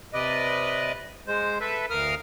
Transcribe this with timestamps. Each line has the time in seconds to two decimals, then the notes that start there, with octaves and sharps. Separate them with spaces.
0.13 C3 B4 D5 D#5
1.27 G#3 C5
1.61 A4 B4 E5
1.90 D2 A#4 F5 D#6 F6